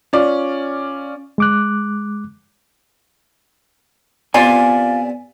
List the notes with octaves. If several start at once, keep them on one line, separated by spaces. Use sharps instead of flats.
C#4 F4 D5
G#3 D6 F#6
C3 B3 F4 D5 G#5